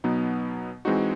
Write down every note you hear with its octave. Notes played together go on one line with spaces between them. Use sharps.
B2 F#3 B3 D#4
E3 G#3 C4 D#4 F#4